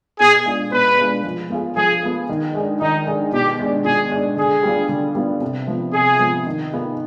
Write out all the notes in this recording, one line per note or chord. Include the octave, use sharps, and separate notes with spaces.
B2 G#4
G#3 D4 F4
B2 B4
G#3 D4 F4
F3
B3 F4 G#4
F3 G#4
B3 F4 G#4
D#3
G#3 D4 G#4
D#3 D#4
G#3 D4 G#4
B2 G4
G#3 D4
B2 G#4
G#3 D4
D3 G#4
G3 B3 D4 F4
D3
G3 B3 D4 F4
C3
F3 B3
C3 G#4
F3 B3
D#3
B3 F4 G#4